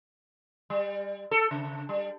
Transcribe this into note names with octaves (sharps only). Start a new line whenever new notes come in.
G3
A4
C#3
G3